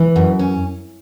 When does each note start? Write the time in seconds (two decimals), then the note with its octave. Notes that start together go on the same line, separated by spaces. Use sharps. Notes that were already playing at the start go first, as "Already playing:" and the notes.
Already playing: E3
0.16 F#2
0.39 C#4